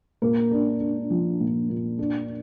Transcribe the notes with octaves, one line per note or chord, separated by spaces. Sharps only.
A#2 A#4
D4
D4
F3
A#2
A#2
D4